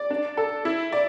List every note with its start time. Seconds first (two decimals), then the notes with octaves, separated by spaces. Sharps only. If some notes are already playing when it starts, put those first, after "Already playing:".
Already playing: D5
0.10 D4
0.37 A4
0.65 E4
0.92 D5